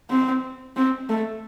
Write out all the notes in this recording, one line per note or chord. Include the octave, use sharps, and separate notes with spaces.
C4
C4
A3